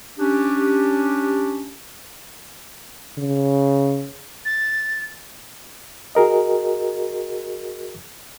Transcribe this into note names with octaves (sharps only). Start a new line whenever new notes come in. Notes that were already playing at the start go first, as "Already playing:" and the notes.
C#4 D4 G4
C#3
A6
F#4 G#4 A#4 D#5